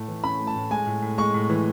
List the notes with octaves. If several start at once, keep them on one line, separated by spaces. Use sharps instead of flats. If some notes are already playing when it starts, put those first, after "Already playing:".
Already playing: A2 A3
E3
C#4 B5
A3
A5
A2
G#3 G#5
A2
A2
G#3 C#6
A2
E3